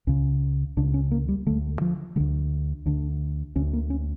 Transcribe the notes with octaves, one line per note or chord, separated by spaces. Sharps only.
C#2 C#3 C#4
C#2 C#3 D4
C#4
A#3
G3
D2 D3 A3
F3
D2 D3 G3
D2 D3 D4
D2 D3 C#4
A#3
C#4